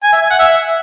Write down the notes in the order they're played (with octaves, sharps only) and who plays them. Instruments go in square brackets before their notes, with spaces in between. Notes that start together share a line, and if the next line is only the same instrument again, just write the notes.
[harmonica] G#5
E5
G#5
F#5
E5